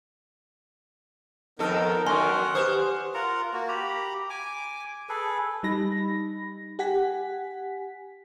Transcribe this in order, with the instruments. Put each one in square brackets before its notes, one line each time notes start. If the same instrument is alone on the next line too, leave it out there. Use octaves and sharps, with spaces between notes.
[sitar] F2 D#3 A4 [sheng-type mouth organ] B3 D#4 A#4
[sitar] F#2 D#3 [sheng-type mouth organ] F#5 F6 [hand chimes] G#5 C#6 [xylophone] C6
[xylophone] G4 B4 D#6 [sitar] C5
[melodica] F4 A#4 F#5 A#5
A#3 F#4
G4 A#5 B5
G#5 D6
G#4 A4 B4
[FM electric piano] G3 D#4 B5 A#6
G4 F#5 G#5 B6